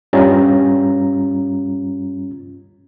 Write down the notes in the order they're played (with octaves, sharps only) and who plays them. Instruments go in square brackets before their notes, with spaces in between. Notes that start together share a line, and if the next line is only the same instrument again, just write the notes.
[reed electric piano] G2 G3 C#4 F4 A#5